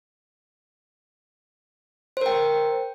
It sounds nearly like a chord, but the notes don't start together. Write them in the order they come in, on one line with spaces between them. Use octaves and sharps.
C5 A#4 G5